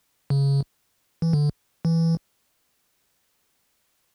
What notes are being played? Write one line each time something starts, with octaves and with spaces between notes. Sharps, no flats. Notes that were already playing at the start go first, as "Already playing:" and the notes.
C#3
E3
D3
E3